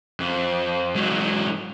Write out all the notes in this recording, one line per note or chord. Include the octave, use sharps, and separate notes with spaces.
F2
G#2 F#3